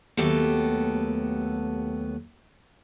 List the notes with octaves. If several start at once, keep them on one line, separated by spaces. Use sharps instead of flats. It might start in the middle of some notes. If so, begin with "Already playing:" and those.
D#2 F#3 A3 B3 G4 A4